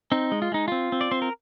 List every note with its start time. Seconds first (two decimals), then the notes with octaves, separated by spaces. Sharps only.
0.12 C4 D#4
0.32 G#3
0.42 F4
0.52 G#3 D#4
0.68 C4 F4
0.92 C4
1.01 D5
1.11 C4 C5
1.22 A#4